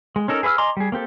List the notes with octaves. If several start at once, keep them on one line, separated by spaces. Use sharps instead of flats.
G#3
C#4 D#4 A4 A#4
G#4 B4 E5 E6 F6
D#5 G#5 A#5 C6 D6
G3 G#4
A#3 C4 G4 A4